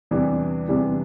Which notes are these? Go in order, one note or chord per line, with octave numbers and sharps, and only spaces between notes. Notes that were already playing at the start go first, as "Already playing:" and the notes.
E2 C3 E3 G3 D4
E2 C3 E3 G3 D4